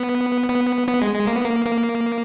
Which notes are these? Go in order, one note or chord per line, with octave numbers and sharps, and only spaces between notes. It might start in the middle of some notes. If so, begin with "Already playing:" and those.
Already playing: B3
B3
B3
G#3
G#3
A#3
B3
A#3
A#3